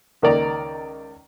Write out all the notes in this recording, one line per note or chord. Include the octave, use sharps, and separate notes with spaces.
C#2 D#3 A#3 D5 A#5